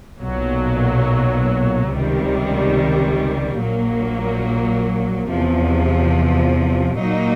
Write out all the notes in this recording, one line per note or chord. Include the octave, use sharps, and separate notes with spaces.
B1 A#2 F#3
C#2 C3 D#3 G3
A#1 A#2 F#3 A#3
E2 C3 F3
A#2 F#3 A#3 D#4